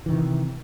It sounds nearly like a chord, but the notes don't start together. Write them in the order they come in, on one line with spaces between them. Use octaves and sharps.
E3 D#3 C3